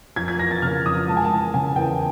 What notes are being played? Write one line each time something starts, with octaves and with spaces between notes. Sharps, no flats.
F2 G#6
G#6
E3 A#6
A6
C#3 F6
F2 D#6
G#3 A5
G#5
A5
E3
C#3 G#5
E2 G5